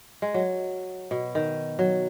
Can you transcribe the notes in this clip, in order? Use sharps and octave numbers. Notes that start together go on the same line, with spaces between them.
G#3
F#3
B2
D#3
F#3